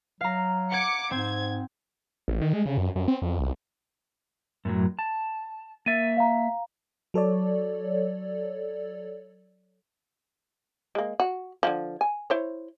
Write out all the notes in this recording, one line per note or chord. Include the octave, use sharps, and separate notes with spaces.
F#3 F5 A#5
F#5 D6 G#6 C#7
G#2 C4 G#6
A1
D#3
G#3
C#3
F#2
F#2
C4
F2
C2
F#2 A2 F#3
A5
A#3 E5 A6 D#7
F5 A#5
F#3 A4 C#5 D5
G#3 A#3
F#4
D3 E3 F3
G#5
E4 C5 C#5